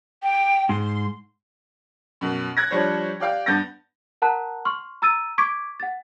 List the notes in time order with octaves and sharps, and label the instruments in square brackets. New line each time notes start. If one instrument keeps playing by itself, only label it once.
[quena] G5
[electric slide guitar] G#2 [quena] C6
[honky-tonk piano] F#2 B2
F#6 G#6 A#6
F3 G3 D4 C5 C#5
G4 D5 F5 G5
G2 B3 G6 A6 A#6
[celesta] A#4 F#5 A5 A#5 F#6
C6 C#6 F6
A#5 E6 A6 D#7
C#6 D6 G#6 B6 D7
F#5 A6